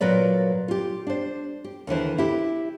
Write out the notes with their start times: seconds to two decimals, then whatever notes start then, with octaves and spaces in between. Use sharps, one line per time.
0.01 A#2 F#3 A#4 B4 D5
0.68 F4 G4
1.07 D4 C5
1.64 G4
1.87 D#2 D3 E3 C5
2.18 E4 G4